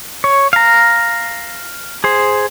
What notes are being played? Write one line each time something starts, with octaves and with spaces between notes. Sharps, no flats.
C#5
F5 A#5
G#4 C5